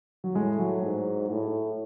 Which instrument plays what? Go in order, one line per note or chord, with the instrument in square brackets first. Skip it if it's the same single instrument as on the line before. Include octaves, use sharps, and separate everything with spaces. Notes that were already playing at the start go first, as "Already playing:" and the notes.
[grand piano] F#3
[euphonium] A2 [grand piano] G#3
[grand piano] F#3
[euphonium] G#2
A2